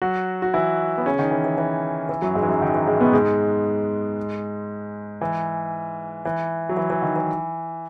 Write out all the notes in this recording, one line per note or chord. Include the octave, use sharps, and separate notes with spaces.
F#3 F#4
F#4
E3 E4
B3
C#3 C#4
D#3
E3
E3
E3
E3
F#2 F#3
G#2 G#3
E3
F#2 F#3
D#3
E3
G#2 G#3
B2 B3
G#2 G#3
E3
E3
F#3
E3
E3
D#3
E3